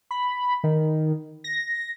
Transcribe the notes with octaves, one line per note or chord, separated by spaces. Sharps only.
B5
D#3
A#6